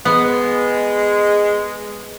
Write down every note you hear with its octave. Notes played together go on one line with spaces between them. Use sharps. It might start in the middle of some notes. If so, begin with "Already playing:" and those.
G#3 B3